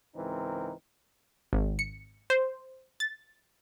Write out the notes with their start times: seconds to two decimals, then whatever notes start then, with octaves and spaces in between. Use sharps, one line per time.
0.16 C#2 G#2 E3 C4 D#4 A#4
1.53 G#1
1.79 C#7
2.30 C5
3.00 A6